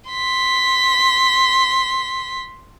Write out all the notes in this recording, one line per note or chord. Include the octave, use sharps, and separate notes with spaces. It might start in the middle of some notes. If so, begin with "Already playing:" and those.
C6 B6